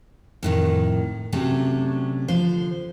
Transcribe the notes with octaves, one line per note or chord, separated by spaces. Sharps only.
F2 A2 D#3
C3 F#3 A3 C#4 D4
D3 F3 C5